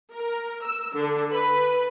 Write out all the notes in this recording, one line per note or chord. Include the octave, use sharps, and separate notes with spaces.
A#4
E6
D3
B4